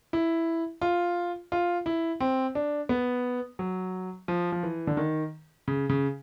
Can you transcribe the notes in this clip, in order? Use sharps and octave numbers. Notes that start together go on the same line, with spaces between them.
E4
F4
F4
E4
C4
D4
B3
F#3
F3
F3
E3
D3
D#3
C#3
C#3